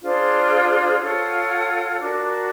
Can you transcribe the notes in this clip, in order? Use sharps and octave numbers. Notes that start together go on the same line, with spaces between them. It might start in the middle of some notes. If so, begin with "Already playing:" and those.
D4 F4 G#4 C5
F4 A4 C#5 F#5
D4 F#4 A#4